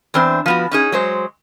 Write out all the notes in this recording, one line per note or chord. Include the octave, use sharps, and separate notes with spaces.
E2 E3 C4 D4 C5
F3 B3 F#4
C#4 D#4 G#4
F#3 G#3 C5